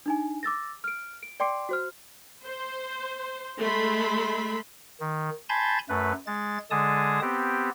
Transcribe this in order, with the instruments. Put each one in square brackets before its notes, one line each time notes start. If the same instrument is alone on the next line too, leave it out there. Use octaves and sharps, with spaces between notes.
[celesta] D4 D#4 G#5
D6 E6 A6 A#6
F6 D7
D7
D5 G5 C6 D6 C7 D7
F#4 C5 F6
[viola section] C5
G#3 A3 E5 B5 C6
[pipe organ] D#3
G#5 A5 B5 C6 G6 A6
F#2 A3 B4
G#3 A6
D3 G#3 G#4 A5 D#6
B3 C4 G4